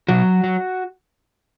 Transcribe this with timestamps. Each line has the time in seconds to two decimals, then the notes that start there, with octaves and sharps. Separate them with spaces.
0.08 B2 F#3 F#4
0.44 F#3